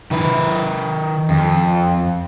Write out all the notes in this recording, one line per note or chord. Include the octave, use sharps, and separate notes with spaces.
D#3 B4
F2